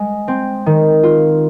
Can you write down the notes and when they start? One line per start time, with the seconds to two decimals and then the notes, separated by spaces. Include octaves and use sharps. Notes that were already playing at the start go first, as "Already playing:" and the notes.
Already playing: G#3
0.28 C4
0.66 D#3
1.03 F4